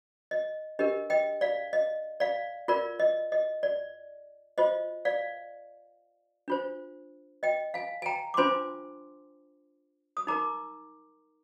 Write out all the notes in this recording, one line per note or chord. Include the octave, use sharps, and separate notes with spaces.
D#5
D4 G4 A#4 D#5
D#5 G5
D5 F5
D#5
D5 F5
F4 A#4 D5
D#5
D#5
D5
F4 C5 D#5
D5 F5
D4 F4 C5
D#5 G5
F5 G#5
G#5
G5 A#5
D6
D4 F4 C5 G#5 C6
D#6
D#4 A#4 A#5 D6